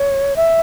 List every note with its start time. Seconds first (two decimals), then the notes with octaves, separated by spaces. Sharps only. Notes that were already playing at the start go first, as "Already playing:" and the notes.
Already playing: C#5
0.36 E5